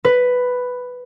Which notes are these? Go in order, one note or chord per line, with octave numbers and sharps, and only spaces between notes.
B4